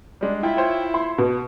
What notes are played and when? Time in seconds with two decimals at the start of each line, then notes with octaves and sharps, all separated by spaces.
0.21 G3 G#3 D4
0.43 E4 F4 G5
0.57 F4 C5 C#5
0.94 C6
1.18 B2